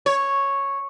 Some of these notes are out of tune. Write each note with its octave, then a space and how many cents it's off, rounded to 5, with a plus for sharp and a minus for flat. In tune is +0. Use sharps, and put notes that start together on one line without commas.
C#5 -5